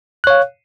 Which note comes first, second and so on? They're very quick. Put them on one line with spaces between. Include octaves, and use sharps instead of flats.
F#6 C#5 F5